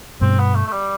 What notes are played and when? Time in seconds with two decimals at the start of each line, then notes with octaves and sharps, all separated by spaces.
0.21 G2 B2 C4
0.39 B3
0.55 A3
0.67 A3
0.72 G3